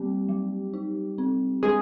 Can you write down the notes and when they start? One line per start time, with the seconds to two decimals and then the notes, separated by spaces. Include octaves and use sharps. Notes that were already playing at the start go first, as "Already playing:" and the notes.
Already playing: G3 A#3 C4 G4
0.29 F#3
0.74 D#4
1.18 C4
1.63 G#3 D4 G#4